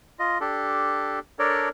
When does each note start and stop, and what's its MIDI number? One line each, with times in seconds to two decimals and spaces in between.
0.19 0.38 65
0.19 0.38 75
0.41 1.19 62
0.41 1.19 67
0.41 1.19 69
1.39 1.69 62
1.39 1.69 69
1.39 1.69 70
1.39 1.69 73
1.39 1.69 74